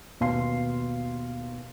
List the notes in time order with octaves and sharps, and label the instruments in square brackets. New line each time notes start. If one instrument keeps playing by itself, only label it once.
[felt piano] D#2 B2 F5 C6 C7